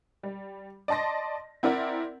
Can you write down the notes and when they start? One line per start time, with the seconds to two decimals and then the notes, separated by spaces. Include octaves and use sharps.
0.23 G3
0.88 D5 D#5 A5 C6 A#6
1.63 C4 E4 A#4 D5 F#5